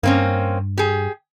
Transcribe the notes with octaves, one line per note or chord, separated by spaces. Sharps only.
G2 A#3 C4 C#4
G4 G#4